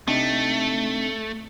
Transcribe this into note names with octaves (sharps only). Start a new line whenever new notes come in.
C3 A3 D4 D#4